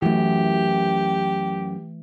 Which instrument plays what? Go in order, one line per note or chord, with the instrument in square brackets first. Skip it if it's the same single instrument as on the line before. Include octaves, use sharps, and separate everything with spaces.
[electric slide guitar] F#2 [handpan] E3 A3 [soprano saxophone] G4